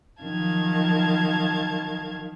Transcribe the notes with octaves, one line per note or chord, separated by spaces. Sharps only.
D#3 F3 F#3 F5 A5 G#6